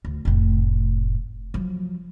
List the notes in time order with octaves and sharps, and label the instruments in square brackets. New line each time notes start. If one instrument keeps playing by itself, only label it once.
[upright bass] D2
F1 A2
F3 F#3